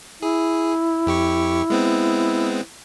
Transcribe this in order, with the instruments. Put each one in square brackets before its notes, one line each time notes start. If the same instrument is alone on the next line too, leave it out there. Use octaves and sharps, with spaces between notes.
[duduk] E4 [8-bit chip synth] G#4
[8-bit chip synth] F2 G4 C#6
G#3 B3 C4